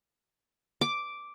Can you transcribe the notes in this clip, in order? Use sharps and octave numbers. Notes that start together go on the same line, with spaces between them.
D6